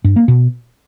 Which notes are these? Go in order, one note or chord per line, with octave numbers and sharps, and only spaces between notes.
G2
A#3
B2